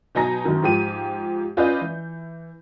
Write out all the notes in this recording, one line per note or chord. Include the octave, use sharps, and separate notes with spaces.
B2 F#3 D#4 G#5 A#5 A#6
F#2 D#3
G#2 F3 G4 D#7
C#4 F4 B4 D5 D#5 G6
E3